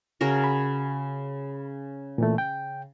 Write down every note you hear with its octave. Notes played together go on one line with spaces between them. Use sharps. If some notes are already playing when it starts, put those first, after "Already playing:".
C#3 F#4 A#4
B5
A#2 E3 A3
G5